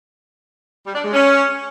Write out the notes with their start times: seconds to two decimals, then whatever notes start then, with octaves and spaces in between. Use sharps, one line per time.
0.86 G3
0.95 D4
1.04 G#3
1.13 C#4